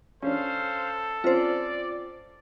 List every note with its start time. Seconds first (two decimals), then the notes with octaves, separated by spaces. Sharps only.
0.22 C#4 D4 A4 C5 F5
1.24 C4 C#4 F4 C5 D5